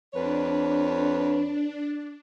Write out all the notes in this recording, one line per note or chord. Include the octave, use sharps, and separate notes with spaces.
F2 D4 B4 C#5